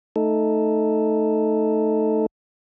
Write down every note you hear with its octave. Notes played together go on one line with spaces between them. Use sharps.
A3 D#4 A4